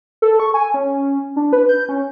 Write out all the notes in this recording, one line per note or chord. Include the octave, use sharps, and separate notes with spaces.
A4
C#6
G#5
C#4
D4
B4
G6
C#4